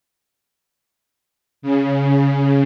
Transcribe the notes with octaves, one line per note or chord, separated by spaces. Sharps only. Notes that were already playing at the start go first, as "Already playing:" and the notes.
C#3